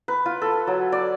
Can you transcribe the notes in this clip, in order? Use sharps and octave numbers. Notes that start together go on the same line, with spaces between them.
B4
F4
A4
F#3
D5